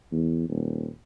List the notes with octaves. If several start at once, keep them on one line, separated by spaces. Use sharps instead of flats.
E2
D#1